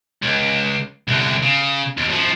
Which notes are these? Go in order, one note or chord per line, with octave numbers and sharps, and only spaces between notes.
C#2
C2 D3
C#3
D#2
F#2 F3